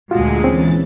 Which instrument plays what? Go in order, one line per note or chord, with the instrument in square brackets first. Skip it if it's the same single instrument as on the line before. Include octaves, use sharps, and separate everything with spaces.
[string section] D2 A#2 G#3 [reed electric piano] F4 F#4
[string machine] E3 A6 [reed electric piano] C4 C#4